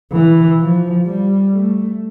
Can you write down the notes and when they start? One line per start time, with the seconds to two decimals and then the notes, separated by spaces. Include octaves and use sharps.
0.12 E3
0.59 F3
1.06 G3
1.53 A3